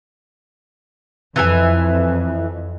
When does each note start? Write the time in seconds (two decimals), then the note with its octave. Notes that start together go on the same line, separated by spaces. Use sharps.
1.36 F2 E3 E5 G#5